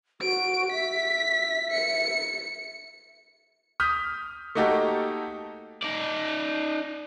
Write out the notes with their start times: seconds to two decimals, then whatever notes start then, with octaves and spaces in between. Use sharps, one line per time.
0.21 F#4 D7
0.72 E5 B6
1.71 C#7
3.80 D#6 F6 G6 B6
4.55 A3 A#3 D#4 F#4 G4 A4
5.82 D#4 D5